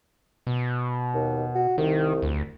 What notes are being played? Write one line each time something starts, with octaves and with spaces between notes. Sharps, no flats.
B2
D#2
F#4
C2 D#3
D2